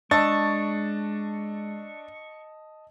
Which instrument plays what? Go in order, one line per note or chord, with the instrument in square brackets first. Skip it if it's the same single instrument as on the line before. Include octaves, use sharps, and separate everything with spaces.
[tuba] G#3 [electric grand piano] D4 A6 [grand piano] D#5 A5 E6 [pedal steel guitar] C#6